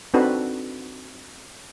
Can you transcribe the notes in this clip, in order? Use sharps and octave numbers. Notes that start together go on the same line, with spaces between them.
C4 D4 D#4 F#4 A4 B4